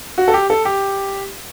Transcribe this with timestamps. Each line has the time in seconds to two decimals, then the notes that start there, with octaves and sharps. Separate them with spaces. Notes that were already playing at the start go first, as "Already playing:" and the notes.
0.18 F#4
0.28 A4
0.34 G4
0.50 A4
0.65 G4